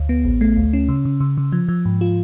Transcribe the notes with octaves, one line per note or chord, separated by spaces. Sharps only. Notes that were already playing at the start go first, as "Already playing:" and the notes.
Already playing: D2
B3
A1
A3
D2
C#4
C#3
C#3
C#3
C#3
F3
F3
G#2
F4